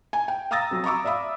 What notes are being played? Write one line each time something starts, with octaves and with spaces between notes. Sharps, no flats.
G#5
G5
F5 A#5 D#6 E6 A6 A#6
F2 F#3
A#5 B5 C#6 D6 E6
D5 E5 F5 B5 D#6